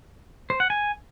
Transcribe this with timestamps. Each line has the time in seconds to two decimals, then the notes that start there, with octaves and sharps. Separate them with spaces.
0.50 C5
0.60 F#5
0.70 G#5